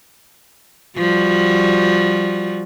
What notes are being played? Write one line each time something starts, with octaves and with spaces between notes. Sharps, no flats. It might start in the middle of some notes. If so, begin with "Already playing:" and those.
F3 G3 F#4